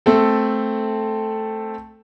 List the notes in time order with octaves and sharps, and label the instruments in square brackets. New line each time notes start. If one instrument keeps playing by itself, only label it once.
[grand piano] A3 C4 A4